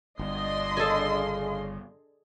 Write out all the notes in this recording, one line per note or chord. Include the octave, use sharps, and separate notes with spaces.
G1 D4 D#5 C6
C#3 G#4 A4